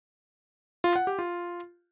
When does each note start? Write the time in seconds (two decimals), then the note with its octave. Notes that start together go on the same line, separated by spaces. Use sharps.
0.84 F4
0.96 F#5
1.07 G4
1.19 F4